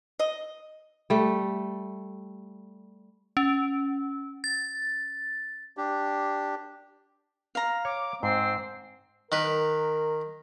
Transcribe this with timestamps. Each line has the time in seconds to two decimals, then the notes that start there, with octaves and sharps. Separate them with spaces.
0.19 D#5
1.10 G3 A3
3.37 C#4
4.44 A6
5.77 D4 G4
7.55 F5 A#5
7.85 C#5 D6
8.23 G#2 C4 C7
9.32 D#3 A#4 B4